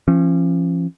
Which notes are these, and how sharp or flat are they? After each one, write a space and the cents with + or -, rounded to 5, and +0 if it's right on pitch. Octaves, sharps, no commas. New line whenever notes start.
F3 -35 C#4 -30